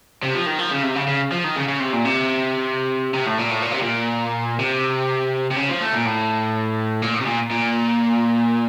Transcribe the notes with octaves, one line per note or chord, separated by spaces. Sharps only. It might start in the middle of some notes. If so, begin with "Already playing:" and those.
C3
F3
D#3
F3
C#3
C3
C#3
C#3
F3
D#3
C#3
C#3
C3
A#2
C3
C3
A2
A#2
A2
A#2
C3
A#2
C3
C3
C#3
F3
A3
A#2
A2
A#2
A2
C3
A#2
A#2